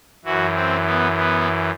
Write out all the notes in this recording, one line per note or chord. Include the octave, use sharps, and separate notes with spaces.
F#2 E3 F#4
C4
B3
B3